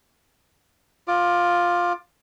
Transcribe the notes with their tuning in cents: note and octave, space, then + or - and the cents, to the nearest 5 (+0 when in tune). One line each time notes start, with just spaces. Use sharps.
F4 +10 D6 +20